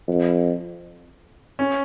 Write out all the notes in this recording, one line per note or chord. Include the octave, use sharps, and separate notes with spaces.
F2
C#4